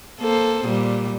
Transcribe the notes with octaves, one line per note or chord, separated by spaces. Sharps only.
A#3 A4 C5
A#2 G3